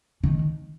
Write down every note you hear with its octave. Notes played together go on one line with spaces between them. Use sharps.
D#3